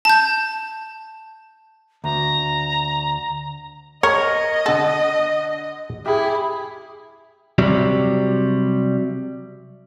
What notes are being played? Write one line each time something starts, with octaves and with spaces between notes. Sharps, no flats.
A5 G6
D2 A#5
A#4 C#5 D#5
D3 A4 F#5
E4 G4 G#4
C3 F#3 G3